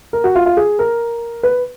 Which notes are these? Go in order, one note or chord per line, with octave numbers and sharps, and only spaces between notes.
A#4
F#4
F4
F4
G#4
A#4
B4